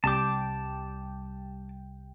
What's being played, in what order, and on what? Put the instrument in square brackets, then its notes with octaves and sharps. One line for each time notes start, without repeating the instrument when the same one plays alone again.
[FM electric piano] C2 G3 G5 [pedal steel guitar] A5 D6